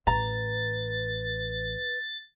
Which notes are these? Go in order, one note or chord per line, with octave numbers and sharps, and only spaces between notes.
A1 B4 A#5 A6